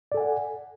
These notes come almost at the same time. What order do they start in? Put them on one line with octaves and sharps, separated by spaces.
D5 A4 G#5 F#5